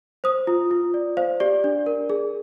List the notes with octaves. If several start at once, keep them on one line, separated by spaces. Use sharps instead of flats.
C5 D#6
F4
F4
D5
C5 F5
G4 D5
D4
A#4
G#4